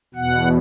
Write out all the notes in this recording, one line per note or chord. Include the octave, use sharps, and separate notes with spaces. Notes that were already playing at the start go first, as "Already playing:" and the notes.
E2 B2 F#5